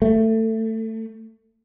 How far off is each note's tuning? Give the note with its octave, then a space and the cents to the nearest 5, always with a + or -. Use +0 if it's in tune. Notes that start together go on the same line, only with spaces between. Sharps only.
A3 +20